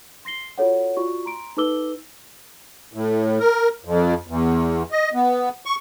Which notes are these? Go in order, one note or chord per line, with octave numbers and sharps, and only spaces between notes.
C6 A#6 C7 G7
F4 F#4 A4 C#5 F#5
F4 F#4 D5 C#6
A#5 C6 D7
D#4 A4 B4 D6 E6 G7
A2
A#4
F2
E2
D#5
B3
C#6